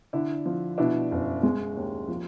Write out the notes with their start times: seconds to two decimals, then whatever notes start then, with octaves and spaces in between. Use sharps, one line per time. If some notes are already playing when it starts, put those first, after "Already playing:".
0.13 D3 D4 E4
0.46 F3
0.78 B2 D4 E4
1.11 F#1
1.43 G#3
1.77 D#2
2.08 F3